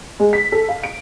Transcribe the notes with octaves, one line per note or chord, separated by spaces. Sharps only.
G#3
B6
A4
F5
D7